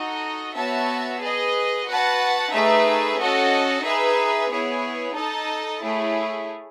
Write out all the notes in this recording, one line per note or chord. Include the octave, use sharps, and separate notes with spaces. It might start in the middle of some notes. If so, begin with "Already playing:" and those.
Already playing: D#4 F#4 A4 D#5
B3 F#4 C#5 E5 A5
G#4 B4 D#5
F#4 B4 F#5 A5
A3 D#4 G#4 B4 E5
C#4 F#4 A4 D#5
D#4 G#4 B4 E5
B3 E4 G#4 C#5
D#4 A4 D#5 A5
A3 E4 G#4 C#5